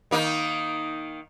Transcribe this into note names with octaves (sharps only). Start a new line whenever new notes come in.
D#3 A#3 D#4